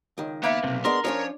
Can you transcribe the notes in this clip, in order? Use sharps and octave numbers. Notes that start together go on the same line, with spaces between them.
C#2 D#3
A#3 B3 B4 E5
B1 G2 C3
G#3 B3 D4 A#4 C6
F3 C#4 D4 F4 C#5